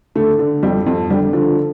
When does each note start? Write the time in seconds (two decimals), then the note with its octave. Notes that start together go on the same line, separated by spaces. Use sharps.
0.15 D3 A3
0.39 D3
0.63 F2 G3
0.86 F2
1.10 D3 G3
1.33 D3 F3